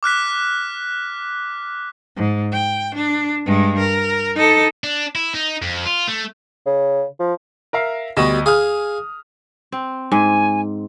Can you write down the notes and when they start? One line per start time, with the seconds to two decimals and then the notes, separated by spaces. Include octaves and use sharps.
0.03 D6 F6 F#6 B6
2.16 G#2
2.53 G5
2.95 D4
3.46 G2 G#3
3.78 A#4
4.35 D#4 A4
4.84 D4
5.15 E4
5.34 D#4
5.62 F2
5.86 F4
6.08 A3
6.66 C#3
7.19 F3
7.73 A#4 E5 F5
8.17 D2 G3 B3 F#4 D#5 E7
8.46 G#4 F5 D#6 F6
9.72 C4
10.12 G#2 G#5